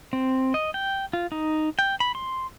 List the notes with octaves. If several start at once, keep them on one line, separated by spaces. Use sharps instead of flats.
C4
D#5
G5
F4
D#4
G5
B5
C6